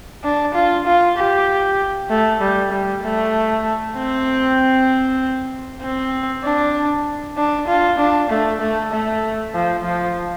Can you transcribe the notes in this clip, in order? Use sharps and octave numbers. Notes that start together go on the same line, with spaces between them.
D4
F4
F4
G4
A3
G3
G3
A3
C4
C4
D4
D4
F4
D4
A3
A3
A3
F3
F3